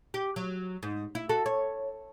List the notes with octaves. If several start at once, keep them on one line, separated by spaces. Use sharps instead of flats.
G4
F#3
G#2
E4
F#4 A4
C#5